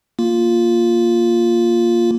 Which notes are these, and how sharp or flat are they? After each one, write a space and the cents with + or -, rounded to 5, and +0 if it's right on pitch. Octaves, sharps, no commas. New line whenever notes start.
A#3 +0 F4 +0